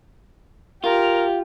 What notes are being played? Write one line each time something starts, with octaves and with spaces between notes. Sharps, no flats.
F4 G4 A#4